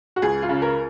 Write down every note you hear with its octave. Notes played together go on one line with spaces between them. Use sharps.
F#4
C#2 G#4
F4
C#3
A#4